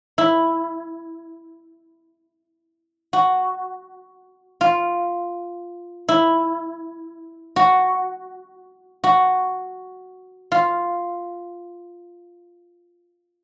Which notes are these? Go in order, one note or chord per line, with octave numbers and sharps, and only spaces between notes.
E4
F#4
F4
E4
F#4
F#4
F4